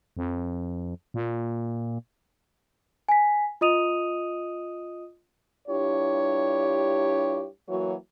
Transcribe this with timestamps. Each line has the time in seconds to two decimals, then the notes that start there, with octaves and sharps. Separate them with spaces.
0.17 F2
1.14 A#2
3.09 G#5 B6
3.61 F4 D#5 D#6 D#7 F7
5.68 G2 D4 E4 F4 G4 C#5
7.69 E3 F#3 A#3 F#4 C#5